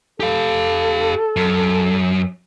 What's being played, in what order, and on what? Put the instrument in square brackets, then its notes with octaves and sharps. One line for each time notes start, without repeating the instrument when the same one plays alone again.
[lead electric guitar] G4 F5 [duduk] A4
[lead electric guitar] F#2